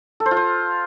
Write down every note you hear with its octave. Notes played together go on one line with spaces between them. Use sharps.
A4
C5
F4
C5